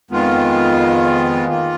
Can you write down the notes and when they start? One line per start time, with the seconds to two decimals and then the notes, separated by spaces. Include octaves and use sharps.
0.10 F2 D#3 G#3 B3 F4
1.48 D#3 A#3 F4